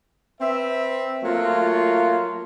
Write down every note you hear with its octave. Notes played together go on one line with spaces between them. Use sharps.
C4 B4 E5
F#3 A3 A#3 F4